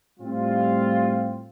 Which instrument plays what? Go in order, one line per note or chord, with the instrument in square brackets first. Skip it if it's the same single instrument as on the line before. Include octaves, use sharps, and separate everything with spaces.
[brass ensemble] A2 G3 C4 F4